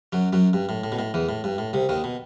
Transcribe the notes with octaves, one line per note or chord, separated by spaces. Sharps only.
F#2 F#3
F#2 F#3
G2
A2
A2
B2
A2
E2 E3
A2
G2
A2
C2 C3
D#2 D#3
B2